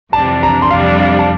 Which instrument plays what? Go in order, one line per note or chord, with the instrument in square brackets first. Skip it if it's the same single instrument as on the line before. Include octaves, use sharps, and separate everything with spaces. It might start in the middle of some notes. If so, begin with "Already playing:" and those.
[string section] F2 C3 E3 G3 D4 [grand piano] A5
[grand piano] A#5
C6
[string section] F2 C3 G3 D4 [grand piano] F5
[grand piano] F5
A5